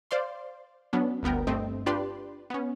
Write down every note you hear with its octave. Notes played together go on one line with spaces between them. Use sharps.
C5 D5 F5 C6
F#3 B3 C#4 D4
G1 D2 B3 A#4 G5
G2 A3 C4 D#5
D4 F4 G4 B4 D5 C6
B3 C#4